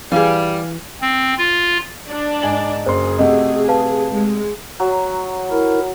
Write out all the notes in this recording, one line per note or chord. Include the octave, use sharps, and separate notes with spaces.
E3 G3 G#4 F5
C4
F4
D4 D5
G#2 G#5 F#7
F#1 G#4 C5 C6
C3 A3 F#4 D#5
B4 F5 A5
G#3
F#3
E4 A#4